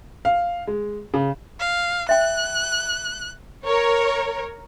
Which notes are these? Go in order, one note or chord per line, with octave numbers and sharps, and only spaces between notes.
F5
G#3
C#3
F5
E5 G5 F#6
A#4 C#5